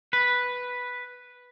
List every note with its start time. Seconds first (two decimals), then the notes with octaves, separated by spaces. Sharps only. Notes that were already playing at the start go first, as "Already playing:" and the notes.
0.13 B4